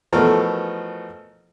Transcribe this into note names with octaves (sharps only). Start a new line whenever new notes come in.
B2 E3 F3 A3 A4 A#4